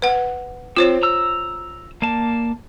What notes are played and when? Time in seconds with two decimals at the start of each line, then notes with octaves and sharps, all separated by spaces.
0.02 B4 F#5
0.77 C4 F4 C5 C#5
1.03 A#5 E6
2.02 A#3 D5 A5